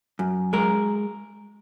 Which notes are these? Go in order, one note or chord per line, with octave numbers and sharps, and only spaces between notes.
F#2
G#3 A#4